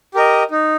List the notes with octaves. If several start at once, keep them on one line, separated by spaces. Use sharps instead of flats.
G4 A#4 D#5
D#4